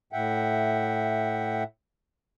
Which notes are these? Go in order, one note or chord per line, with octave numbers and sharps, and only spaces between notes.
A2 E5 F#5 G5